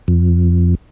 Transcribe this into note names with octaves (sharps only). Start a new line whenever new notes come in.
F2